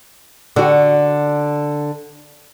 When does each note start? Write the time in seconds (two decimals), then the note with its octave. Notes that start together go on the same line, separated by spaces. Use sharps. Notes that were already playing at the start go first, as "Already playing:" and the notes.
0.56 D3 F#4